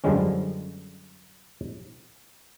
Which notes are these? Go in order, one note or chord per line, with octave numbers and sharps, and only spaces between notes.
F#2 D3 F3 G3 G#3 C#4